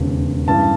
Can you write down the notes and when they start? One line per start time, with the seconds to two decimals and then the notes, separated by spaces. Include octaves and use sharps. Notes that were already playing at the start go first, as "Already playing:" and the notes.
Already playing: E1 D#2 C#3
0.47 A1 G2 E3 A5